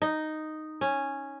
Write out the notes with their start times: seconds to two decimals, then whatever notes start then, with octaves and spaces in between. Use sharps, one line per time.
0.02 D#4
0.81 C#4